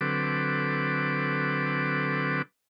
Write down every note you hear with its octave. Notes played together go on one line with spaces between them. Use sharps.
D3 F#3 C4 A4 B4 D6